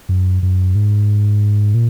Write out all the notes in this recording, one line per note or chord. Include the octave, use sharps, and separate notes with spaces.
F#2
F#2
G#2
A#2